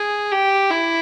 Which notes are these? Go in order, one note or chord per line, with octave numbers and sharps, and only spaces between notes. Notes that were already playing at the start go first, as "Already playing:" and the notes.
Already playing: G#4
G4
E4